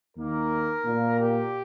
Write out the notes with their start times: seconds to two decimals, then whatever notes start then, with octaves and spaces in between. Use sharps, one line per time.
0.16 D#2 D#3 A#3 A#4
0.85 A#2 A#3
1.19 G4